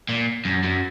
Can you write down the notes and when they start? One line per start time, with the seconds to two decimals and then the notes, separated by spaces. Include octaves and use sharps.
0.09 A#2
0.45 F#2
0.64 F#2